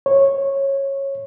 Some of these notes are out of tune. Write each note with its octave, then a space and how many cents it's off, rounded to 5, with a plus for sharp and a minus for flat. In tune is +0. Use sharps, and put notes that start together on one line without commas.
C#5 -15